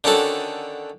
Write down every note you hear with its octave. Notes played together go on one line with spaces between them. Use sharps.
D3 D#3 C#4 F#4 A4